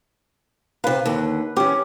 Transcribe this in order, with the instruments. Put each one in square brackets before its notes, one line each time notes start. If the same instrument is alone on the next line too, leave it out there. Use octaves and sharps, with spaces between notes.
[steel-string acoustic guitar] C3 F5 [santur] B4
[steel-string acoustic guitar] D#2 D3
[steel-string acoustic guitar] E3 C#4 [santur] G4